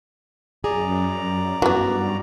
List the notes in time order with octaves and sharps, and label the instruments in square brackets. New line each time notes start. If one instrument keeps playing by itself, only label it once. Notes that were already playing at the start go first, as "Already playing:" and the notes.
[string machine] F#2 [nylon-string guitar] G#4 [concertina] D5 A#5
[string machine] G2 [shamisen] E3 B3 [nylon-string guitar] F#4